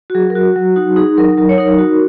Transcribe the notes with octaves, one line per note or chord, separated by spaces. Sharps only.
F#4
F#3 G#4
A#4
F#4
F#3
D#4 F#4
D#4 G#4
F#3 A#4
F#3 A#4
C#5
D#4 A#4
F#4